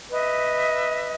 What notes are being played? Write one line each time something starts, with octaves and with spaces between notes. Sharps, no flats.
B4 D#5 E5